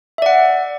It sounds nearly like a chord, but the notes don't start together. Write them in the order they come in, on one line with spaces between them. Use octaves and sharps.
E5 D5 F#5